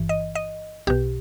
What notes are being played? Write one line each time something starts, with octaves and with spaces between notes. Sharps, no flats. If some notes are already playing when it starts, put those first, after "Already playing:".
Already playing: G1 G2 E3
D#5
D#5
B1 B2 G4